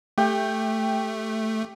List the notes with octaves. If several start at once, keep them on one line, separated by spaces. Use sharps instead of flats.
A3 G4 G5